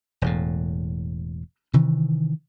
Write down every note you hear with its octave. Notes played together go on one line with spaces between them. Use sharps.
E1 E2 A2
C3 D#3 E3